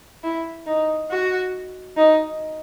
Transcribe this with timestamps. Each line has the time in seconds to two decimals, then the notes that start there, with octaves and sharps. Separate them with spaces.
0.24 E4
0.67 D#4
1.10 F#4
1.96 D#4